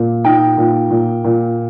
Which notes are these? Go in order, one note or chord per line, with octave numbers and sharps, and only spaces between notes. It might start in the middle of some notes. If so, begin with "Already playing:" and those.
Already playing: A#2
D#4 G5
A#2
A#2
A#2